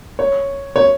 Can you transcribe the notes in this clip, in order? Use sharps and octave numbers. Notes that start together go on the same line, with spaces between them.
C#5
C#5